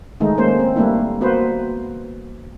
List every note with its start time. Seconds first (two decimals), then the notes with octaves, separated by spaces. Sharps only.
0.20 D#3 G#3 A3 D#4
0.37 G#3 A#3 C#4 C5
0.59 C4
0.76 G3 A3 A#3 D4 E4
1.21 A#3 B3 F#4 B4 C5